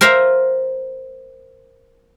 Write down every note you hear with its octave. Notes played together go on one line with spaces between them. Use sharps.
A#4 C5 E5 F5 A#5